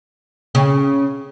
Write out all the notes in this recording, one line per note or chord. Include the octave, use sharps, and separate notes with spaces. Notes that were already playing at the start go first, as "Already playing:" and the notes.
C#3